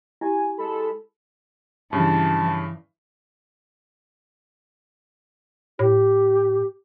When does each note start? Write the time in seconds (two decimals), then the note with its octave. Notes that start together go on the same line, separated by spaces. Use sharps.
0.21 E4 G4 G#5
0.58 G#3 A4 B5
1.93 G2 C#3 E3 A5
5.79 A2 G4